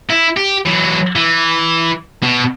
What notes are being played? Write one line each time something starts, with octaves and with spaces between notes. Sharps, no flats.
E4
G4
E3 F#3
E3
B2